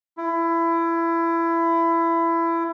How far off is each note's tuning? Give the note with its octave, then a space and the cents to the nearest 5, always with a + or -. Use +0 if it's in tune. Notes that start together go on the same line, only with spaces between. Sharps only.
E4 +20